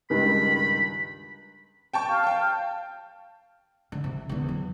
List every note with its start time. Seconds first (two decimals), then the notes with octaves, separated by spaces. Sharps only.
0.10 C#2 G2 D#3 B5
1.93 G5 A5 C#6
2.09 F5
2.24 G5 A5
3.92 D3
4.04 C3
4.29 E2 D3
4.49 F#3